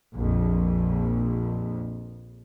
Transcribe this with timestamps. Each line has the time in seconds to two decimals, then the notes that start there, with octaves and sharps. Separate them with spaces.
0.14 A#1 F2